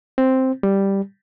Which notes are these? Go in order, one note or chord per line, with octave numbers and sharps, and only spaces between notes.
C4
G3